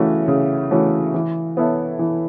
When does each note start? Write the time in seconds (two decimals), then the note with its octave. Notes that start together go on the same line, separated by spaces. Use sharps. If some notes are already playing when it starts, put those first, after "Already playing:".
Already playing: C#3 E3 A3 C#4 F#4
0.28 C#3
0.71 E3 A3 C#4 F#4
1.14 E3
1.57 B3 E4 A4 C#5
1.99 E3